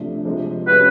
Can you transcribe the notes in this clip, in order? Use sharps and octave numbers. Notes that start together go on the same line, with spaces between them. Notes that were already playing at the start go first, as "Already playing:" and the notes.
Already playing: C3 F3 A3 D4
C3 F3 G#3
G#3 C#4 F#4 B4